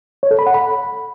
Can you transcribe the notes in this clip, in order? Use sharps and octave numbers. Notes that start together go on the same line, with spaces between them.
C#5
A4
B5
F#5
B5